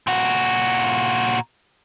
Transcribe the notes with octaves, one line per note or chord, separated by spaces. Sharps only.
A#2 F#4